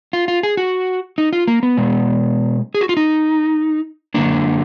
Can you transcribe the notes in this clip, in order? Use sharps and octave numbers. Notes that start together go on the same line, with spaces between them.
F4
F4
G#4
F#4
D#4
F4
A#3
B3
B2 G#3
G#4
F#4
F4
D#4
F#2 D3 F3 A#3 D4